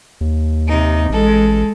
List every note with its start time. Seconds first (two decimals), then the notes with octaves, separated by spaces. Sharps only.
0.21 D#2
0.67 C3 D#4
1.10 A1 G#3 A4